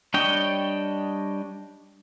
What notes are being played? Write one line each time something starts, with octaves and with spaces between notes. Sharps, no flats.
G3 D4 C#5 D#5 G5